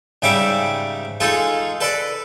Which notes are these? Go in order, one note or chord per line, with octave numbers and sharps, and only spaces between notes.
G#2 C#3 G3 E5 D6
G#3 D#4 F4 A4
A4 B4 D5